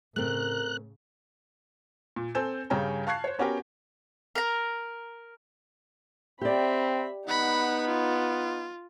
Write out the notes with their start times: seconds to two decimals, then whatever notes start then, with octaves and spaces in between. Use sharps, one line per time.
0.16 A2 C#3 A3 C4 A#4 F#6
2.16 A#2
2.35 C4 A4 G#5 G6 E7
2.70 G2 C#3 C#4 G5 G#5 A#5
3.07 F5 A5 C#6 F#6 G#6 C7
3.24 C5 C#5
3.39 B3 C#4 F#4 G4 A#4 G5
4.35 A#4 A#5
6.41 C4 G4 D5 E5 B5
7.27 B3 D#4 F#5 B5
7.86 F4